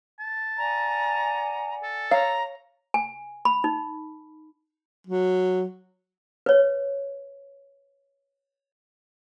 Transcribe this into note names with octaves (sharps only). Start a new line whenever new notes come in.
A5
D5 F#5 G#5 A#5
A4
C#5 F5 A#5
G#5
B5
D#4
F#3
B4 C#5